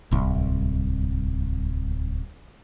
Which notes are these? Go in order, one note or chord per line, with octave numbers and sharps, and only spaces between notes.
D1 C2